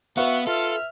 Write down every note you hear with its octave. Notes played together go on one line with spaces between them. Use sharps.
B3 F#4 B4 E5 F5
F4 A4 E5 F6